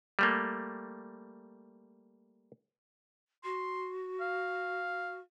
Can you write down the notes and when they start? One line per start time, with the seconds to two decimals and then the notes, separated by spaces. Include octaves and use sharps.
0.19 G3 A3 A#3
3.44 F#4 C6
4.21 F5